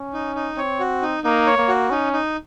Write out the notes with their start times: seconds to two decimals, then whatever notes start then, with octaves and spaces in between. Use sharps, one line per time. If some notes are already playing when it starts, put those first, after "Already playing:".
Already playing: C#4
0.14 D#4
0.36 D#4
0.57 C4 C#5
0.80 F#4
1.02 D#4
1.24 A#3 D#4
1.47 C#5
1.58 A#3
1.68 F#4
1.90 C#4 D#4
2.13 D#4